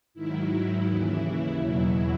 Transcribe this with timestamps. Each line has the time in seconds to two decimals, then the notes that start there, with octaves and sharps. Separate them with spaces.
0.14 G#2 D#3 F#3 E4
0.86 D#2 C#3 E3
1.21 E4
1.57 E2 B2 F#3 E4